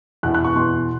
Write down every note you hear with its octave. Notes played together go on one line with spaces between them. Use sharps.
E2 B2 F#6
F#6
C#6
E2 B2 C6